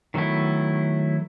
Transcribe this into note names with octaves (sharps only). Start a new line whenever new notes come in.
D#3 F#3 A3 B3 E4